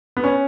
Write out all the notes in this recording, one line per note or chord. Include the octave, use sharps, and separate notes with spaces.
B3
C#4